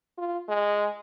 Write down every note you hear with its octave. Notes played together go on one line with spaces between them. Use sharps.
F4
G#3